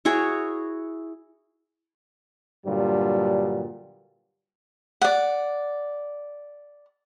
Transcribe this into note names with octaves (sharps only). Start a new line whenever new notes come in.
E4 F#4 G#4 C#5
G2 A#2 D3 F#3 G3
D5 F#5